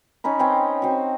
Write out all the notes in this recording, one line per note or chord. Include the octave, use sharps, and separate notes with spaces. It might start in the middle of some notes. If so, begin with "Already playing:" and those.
C#4 D#4 B5
C4 C#4 B4 G5
C4 F#4